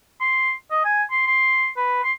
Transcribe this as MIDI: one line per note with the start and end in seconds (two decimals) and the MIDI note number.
0.21 0.52 84
0.71 0.82 75
0.85 1.03 80
1.11 1.23 84
1.26 1.67 84
1.77 2.02 71
2.04 2.11 84